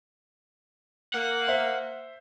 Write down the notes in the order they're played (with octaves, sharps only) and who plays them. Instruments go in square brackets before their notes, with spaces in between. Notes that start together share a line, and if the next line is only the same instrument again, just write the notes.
[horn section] A#3 [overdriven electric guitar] F#5
[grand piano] C5 E5